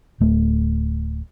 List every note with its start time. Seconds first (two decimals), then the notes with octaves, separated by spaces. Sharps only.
0.21 D1 A3